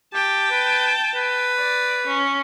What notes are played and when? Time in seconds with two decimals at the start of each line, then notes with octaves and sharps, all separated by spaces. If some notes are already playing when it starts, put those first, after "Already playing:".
0.14 G4 G5 A5
0.51 B4
1.15 B4
1.58 D5
2.07 C#4